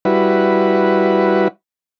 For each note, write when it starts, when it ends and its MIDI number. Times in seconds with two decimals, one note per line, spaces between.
0.05 1.48 55
0.05 1.48 64
0.05 1.48 66
0.05 1.48 71